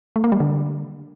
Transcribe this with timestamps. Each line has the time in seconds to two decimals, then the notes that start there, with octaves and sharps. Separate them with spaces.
0.16 A3
0.24 A#3
0.32 G3
0.40 D3